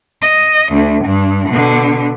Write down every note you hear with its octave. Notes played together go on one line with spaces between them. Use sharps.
D#5
D2
G2
B2 D3